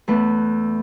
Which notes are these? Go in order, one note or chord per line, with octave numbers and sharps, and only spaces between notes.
E2 A3 B4